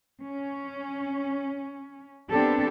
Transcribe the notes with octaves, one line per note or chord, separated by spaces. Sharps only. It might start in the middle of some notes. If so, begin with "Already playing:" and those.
C#4
B3 C4 D4 G4 A4